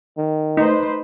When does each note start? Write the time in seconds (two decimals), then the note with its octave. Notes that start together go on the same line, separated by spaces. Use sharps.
0.18 D#3
0.57 A3 D#4 B4 C5